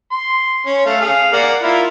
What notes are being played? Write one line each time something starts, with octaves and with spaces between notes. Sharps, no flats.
C6
C#4
A3 F5
G#4 F5
A#3 D5 F#5
E4 F4 A#4